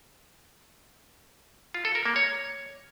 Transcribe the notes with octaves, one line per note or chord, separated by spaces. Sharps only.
F4
A4
A#4
A#3
C#5